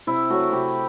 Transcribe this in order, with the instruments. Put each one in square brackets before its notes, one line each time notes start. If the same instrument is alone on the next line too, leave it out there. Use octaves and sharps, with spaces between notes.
[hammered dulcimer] C3 E4
F#3 A3 F#4
C3 G4